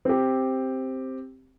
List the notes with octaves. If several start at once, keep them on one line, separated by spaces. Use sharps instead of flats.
C4 G4